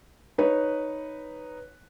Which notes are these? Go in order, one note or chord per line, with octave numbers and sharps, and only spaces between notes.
D#4 B4 C#5